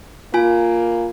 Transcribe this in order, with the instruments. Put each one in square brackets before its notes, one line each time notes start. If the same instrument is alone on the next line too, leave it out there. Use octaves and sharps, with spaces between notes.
[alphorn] A#3 [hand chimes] F4 G#5